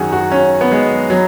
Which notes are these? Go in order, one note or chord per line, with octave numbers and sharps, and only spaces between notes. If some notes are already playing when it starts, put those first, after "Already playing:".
Already playing: G#1 F#2 D#3 F#4 G#4
F#4
C#4
B3
G#3
F#3